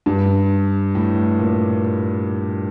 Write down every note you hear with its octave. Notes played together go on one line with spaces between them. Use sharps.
G2
A2
A#2